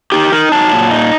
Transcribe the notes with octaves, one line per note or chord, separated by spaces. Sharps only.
D#4 G4
D#4 A#4
F#3 A5
A#2
D#4